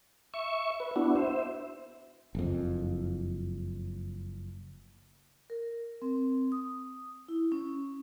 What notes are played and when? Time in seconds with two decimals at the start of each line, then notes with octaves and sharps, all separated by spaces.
0.34 E5 C#6
0.80 B4
0.96 B3 D4 E4 F#4
1.16 C5 E5
2.35 F#1 F2
5.50 A#4
6.02 C4
6.52 D#6
7.28 E4
7.52 C#4